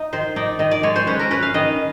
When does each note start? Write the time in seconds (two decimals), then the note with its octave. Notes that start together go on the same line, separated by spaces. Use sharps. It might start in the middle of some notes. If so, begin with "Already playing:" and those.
Already playing: D#4
0.13 D#3 C5
0.36 D#4 D5
0.59 D#3 D#5
0.71 D5
0.83 G#3 C#5
0.96 C5
1.07 C#4 B4
1.19 A#4
1.31 C#4 B4
1.43 F5
1.54 D#3 D#5